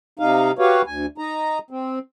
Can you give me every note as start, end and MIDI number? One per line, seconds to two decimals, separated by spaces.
0.19 0.51 48
0.19 0.51 63
0.19 0.51 77
0.59 0.82 66
0.59 0.82 67
0.59 0.82 71
0.59 0.82 73
0.59 0.82 77
0.87 1.06 38
0.87 1.06 80
1.18 1.59 63
1.18 1.59 82
1.71 1.99 60